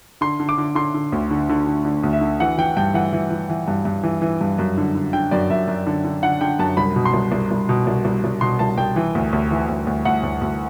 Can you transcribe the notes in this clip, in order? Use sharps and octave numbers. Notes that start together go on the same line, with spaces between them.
D3 C6
D3
D6
D3
D3 C6
D3
D2
D3
D3
D3
D3
D2
E5
D3
E3 F#5
E3 G5
G2 G5
E3 F#5
E3
E3
E3
G2
G2
E3
E3
G2
F#2
D3
D3
D3 G5
F#2 D5
F#2 E5
F#2
D3
D3
D3 F#5
D3 G5
F#2 A5
C2 B5
B2
C6
C2
C2
C2
B2
C2
C2
C2
B2 C6
C2 A5
C2 G5
E3
D2
D2
E3
D2
D2
D2 F#5
D2
D2